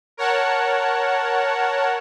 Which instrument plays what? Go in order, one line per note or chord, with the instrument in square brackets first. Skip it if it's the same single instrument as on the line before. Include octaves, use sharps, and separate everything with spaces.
[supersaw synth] A#4 C#5 F#5 A5